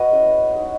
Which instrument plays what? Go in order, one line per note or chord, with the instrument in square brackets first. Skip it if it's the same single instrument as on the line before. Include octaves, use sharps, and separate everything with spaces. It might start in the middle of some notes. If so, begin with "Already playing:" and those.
Already playing: [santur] F#4 B4 D#5
G#3 C#4 E4
G#3 D#4